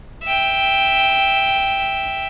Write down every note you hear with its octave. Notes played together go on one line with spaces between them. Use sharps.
E5 G5